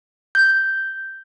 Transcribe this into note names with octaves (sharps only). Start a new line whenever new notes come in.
G6